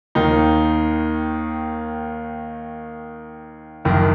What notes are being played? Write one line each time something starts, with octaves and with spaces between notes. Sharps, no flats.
D#2 D#3 D#4
F#1 F#2 D#3